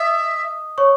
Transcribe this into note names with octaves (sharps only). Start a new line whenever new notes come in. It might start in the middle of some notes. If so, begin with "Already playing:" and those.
Already playing: D#5 E5 D#6
C#5 C#6